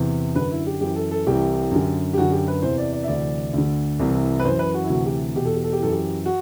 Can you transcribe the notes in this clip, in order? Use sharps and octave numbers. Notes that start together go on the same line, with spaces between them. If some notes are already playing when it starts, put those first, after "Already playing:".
Already playing: E2 C3 E3
F#2 D3 B4
E4
G4
F#2 E3 G4
A4
A4
C2 C3 E3 G4
F#2 D3
G4
F#2 D3 F#4
G4
B4
E2 C3 E3 C5
D5
D5
E5
D2 C3 E3 D5
D2 D3
C2 C3 E3
B4
F#2 E3 C5
B4
F#4
E4
D2 C3 E3 F#4
G4
E2 B2 G4
A4
G4
A4
G4
F#2 E3 A4
G4
F#4